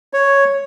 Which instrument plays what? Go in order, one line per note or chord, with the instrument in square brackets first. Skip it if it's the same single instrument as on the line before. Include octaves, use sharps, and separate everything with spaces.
[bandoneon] C#5